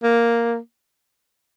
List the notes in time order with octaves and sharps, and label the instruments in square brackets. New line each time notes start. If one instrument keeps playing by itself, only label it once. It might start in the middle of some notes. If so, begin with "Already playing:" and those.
[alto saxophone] A#3